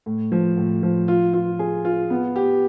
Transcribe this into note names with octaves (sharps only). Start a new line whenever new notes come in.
A2
F3
A2
F3
F4
F4
G#4
F4
B3
G4